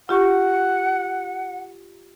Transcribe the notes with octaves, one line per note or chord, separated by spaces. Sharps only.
F4 G4 F#5 C#6